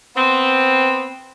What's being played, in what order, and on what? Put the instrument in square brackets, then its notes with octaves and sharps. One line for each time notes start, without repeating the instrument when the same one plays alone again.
[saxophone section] B3 C4